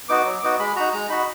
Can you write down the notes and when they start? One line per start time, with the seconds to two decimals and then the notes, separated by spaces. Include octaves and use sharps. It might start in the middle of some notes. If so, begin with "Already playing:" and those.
0.09 B3 D#4 F#4 D6
0.25 F#3
0.42 B3 D#4 F#4
0.59 G#3 B5
0.76 D#4 F#4 A#5
0.93 G#3 A#5
1.09 D#4 F#4 B5